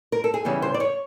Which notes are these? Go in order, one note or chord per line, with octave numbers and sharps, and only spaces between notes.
A#4
A4
G#4
C#3 E3 G3 B3 G4
C5
D5
C#5